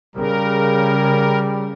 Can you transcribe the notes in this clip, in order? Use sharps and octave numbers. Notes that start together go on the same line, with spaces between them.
C#3 G3 A#4